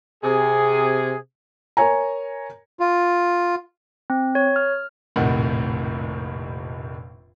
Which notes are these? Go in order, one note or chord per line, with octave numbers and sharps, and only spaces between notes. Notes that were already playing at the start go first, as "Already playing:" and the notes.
C3 G#4
A#4 C#5 G#5 A#5
F4
C4
C#5
F6
F1 A#1 A2 C3 D#3 F#5